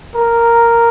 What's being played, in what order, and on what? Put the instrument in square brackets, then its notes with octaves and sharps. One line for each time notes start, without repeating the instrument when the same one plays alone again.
[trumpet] A#4